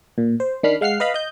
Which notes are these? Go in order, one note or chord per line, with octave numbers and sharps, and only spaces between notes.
A#2
C5
D#3 D4 B5 F6 C7
G#3 F5 F#5 F6 C7
B4 D#5 F5 B5
D#5 G6